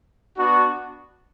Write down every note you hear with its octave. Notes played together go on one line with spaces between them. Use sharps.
B3 D4 F#4